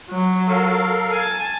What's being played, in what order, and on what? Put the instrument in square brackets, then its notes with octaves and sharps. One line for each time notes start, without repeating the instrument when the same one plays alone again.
[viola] F#3
[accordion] A4 A#4 F5
[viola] G#5 A5